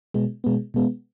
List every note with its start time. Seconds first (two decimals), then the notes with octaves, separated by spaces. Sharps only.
0.14 B2 G#3 B3
0.44 B2 G#3 B3
0.74 B2 G#3 B3